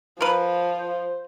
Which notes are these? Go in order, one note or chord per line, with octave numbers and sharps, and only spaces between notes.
F3 A#4 B4
C5